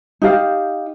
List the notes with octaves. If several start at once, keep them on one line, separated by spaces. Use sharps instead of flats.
D#4 G4 F5